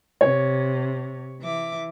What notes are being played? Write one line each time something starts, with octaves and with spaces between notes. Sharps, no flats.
C3 C#5
E3 E5 D6